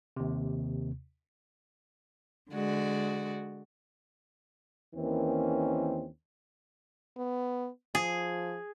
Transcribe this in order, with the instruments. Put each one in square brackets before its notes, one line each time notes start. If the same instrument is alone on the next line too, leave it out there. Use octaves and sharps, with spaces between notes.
[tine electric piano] D#2 C3
[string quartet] D3 G#3 F#4 D5
[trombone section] D#2 D#3 E3 A#3 C4 C#4
[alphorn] B3
[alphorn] F3 [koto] G#4